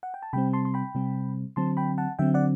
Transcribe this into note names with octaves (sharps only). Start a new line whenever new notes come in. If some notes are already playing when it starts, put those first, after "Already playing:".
F#5
G5
A5
C3 G3 C4 G5 B5
A5 C6
C6
G5 B5
C3 G3 C4
D3 F#3 C4 A5 C6
G5 B5
F#5 A5
D3 F#3 C4 E5 G5
D5 F#5